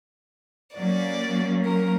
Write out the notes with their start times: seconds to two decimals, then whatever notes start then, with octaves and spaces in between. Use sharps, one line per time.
0.75 F#3 A#3 C#4 D5
1.65 A#4